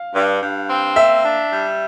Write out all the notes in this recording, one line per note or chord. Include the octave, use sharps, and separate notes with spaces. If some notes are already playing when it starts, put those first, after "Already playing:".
Already playing: F5
G2
G2
C4
A#3 E5
D4
G3